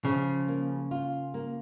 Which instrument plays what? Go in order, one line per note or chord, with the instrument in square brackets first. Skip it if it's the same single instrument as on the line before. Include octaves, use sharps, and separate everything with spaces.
[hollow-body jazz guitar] C#3 [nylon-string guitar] F3
[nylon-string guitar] A#3
F4
A#3